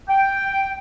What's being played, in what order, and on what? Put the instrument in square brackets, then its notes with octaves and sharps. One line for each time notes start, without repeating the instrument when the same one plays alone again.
[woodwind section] G5